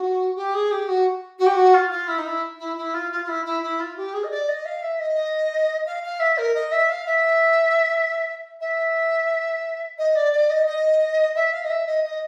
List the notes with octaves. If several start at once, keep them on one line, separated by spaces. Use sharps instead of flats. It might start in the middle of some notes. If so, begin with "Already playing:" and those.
Already playing: F#4
G4
G#4
G4
F#4
F#4
G4
F#4
F4
F4
E4
D#4
E4
E4
E4
F4
F4
F4
E4
E4
E4
F4
G4
G#4
D#5
D5
D#5
F5
E5
D#5
F5
F5
E5
A#4
D#5
E5
F5
E5
E5
D#5
D5
D5
D#5
D#5
E5
F5
D#5
E5
D#5
D#5